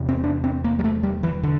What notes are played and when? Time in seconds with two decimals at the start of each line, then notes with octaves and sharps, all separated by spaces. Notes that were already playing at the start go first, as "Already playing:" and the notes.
Already playing: E2 C3
0.09 C4
0.24 D4
0.44 C4
0.64 A#3
0.79 G3
0.84 A3
1.03 G3
1.23 E3
1.43 D3